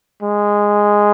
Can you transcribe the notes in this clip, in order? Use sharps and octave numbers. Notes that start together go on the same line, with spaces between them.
G#3